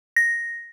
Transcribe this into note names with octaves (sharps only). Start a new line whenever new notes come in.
A#6